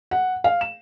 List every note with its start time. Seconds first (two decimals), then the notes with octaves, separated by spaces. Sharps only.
0.11 F#5
0.44 F5
0.61 E7